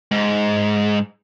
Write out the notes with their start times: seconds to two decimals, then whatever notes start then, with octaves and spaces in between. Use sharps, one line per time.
0.11 G#2